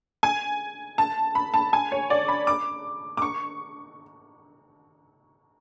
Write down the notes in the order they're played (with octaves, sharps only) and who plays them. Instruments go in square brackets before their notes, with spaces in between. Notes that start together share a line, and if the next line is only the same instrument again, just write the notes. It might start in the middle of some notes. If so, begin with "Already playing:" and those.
[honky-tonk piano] G#5
A5
B5
A5
G#5
C#5
D5
B5
D6
D6
C#6